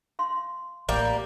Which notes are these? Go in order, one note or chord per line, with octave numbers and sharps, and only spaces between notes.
F5 C6
A1 G3 A#3